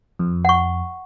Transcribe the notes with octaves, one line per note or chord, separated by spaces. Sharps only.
F2
F#5 C#6